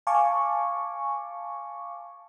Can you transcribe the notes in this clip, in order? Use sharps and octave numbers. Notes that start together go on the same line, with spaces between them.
F5 G#5 A5 C#6 D6